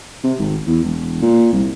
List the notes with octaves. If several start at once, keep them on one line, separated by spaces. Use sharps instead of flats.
C3
G#1
E2
E1
A#2
C2